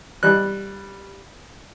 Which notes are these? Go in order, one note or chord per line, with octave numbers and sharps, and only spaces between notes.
G3 F#6